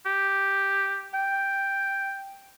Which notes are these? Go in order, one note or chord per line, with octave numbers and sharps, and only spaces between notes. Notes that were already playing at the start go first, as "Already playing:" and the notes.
G4
G5